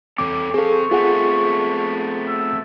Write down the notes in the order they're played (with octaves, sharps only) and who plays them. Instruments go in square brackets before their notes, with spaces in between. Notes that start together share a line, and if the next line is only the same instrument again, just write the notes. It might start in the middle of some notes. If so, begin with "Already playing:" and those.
[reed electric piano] E2 D6 [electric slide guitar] C4 A4 C#5
[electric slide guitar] C4 F5 [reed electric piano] G#4 A4 [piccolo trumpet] C#6
[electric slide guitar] A3 B3 C4 [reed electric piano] F4 G#4 F#5
[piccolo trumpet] E6